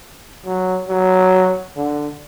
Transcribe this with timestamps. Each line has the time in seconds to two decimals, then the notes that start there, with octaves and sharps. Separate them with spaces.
0.45 F#3
0.89 F#3
1.76 D3